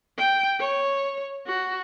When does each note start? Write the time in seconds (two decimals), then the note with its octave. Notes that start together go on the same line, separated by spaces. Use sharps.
0.18 G5
0.60 C#5
1.47 F#4